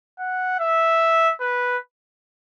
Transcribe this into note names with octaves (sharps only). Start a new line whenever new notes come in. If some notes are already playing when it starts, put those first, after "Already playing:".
F#5
E5
B4